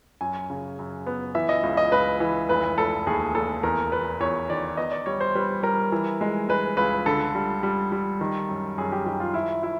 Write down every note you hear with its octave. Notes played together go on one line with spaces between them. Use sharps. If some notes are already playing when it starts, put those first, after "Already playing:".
F#2 G#5
C#3
F#2
B3
E3 E5
D#5
C#2
D#5
C#2 B4
E3
F1 B4
F1 A4
D#2 G#4
F1 A4
E2 A#4
E2 B4
E2 C#5
D#3 D5
B3 D#5
D5
G3 C#5
C5
G3 B4
G3 A#4
E3
G#3
G#3 B4
C#2 B4
D3 A4
G3
G3
G3
D#3
F#2
F#2 G#4
G4
D#3 G4
F4
F3 E4
F3 E4